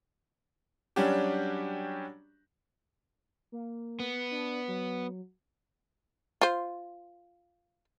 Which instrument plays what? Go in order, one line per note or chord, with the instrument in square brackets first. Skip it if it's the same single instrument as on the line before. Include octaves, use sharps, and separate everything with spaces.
[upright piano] F#3 G3 C#4 D4 F#4 G4
[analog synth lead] A#3
[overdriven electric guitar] B3
[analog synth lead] D4
F#3
[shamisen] F4 C5